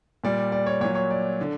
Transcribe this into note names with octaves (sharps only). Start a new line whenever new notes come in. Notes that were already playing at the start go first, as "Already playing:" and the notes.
A#2 G3 D5
D5
C#5
A#2 F#3 C#5
C#5
D5
D3